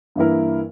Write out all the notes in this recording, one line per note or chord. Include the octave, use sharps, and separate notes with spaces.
G2 E3 A#3 E4 A#4